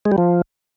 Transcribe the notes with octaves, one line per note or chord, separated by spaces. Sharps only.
G#3
G3
F3